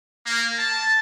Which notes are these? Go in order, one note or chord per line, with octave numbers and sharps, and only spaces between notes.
A#3
A5